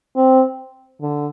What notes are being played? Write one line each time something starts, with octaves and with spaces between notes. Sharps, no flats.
C4
D3